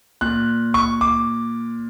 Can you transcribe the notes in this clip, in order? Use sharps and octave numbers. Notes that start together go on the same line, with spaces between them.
A#2 F#6
C#6
D6